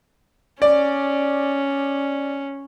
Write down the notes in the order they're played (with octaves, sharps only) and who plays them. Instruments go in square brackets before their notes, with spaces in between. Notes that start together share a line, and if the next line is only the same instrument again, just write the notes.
[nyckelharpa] C#4 [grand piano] D5